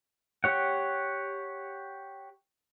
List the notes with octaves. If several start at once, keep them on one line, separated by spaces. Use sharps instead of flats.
G4 C#5 F#5